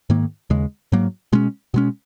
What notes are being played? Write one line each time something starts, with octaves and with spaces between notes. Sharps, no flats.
G#2 D#3 A#3
D#2 C#3 G#3
G#2 F#3 A#3
B2 G#3 C#4
B2 G#3 C#4